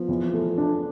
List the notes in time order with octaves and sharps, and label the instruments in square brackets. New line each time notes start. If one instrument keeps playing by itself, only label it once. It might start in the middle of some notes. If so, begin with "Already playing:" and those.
Already playing: [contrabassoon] F3 [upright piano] B3
[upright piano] E2
A3
D4